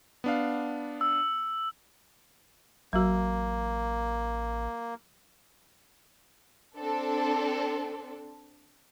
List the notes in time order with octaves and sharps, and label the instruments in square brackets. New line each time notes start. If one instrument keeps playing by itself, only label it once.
[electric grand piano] B3 D4 F5
[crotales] E6
[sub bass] A1 [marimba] F#3 F#4 [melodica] A#3
[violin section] C4 D4 A4